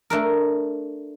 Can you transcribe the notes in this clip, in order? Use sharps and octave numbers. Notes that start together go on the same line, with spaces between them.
A3 D4 A#4